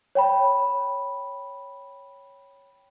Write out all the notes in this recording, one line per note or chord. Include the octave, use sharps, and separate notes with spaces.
C#5 G5 B5